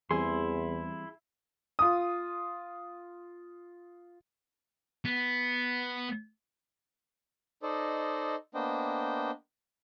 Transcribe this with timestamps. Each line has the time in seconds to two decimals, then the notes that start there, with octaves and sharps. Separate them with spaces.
0.11 E2 E3 G3 C4 E4 G#4 C6
1.79 F4 D#6
5.05 B3
7.63 D#4 A4 C5 D5 D#5
8.55 A#3 B3 D4 C5 D#5 G5